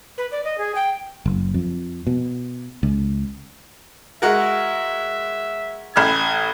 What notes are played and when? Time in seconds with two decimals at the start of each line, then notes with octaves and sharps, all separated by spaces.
0.18 B4
0.32 D5
0.44 D#5
0.58 G#4
0.75 G5
1.26 F#1
1.54 F2
2.07 B2
2.83 C#2
4.22 G#3 F#4 A#4 E5
5.96 A1 B5 F6 G#6